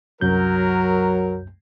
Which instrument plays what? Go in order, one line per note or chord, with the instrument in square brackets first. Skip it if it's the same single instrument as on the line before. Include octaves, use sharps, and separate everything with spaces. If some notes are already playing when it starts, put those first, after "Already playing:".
[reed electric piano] C2 F#2 G6 [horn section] F#3 A#4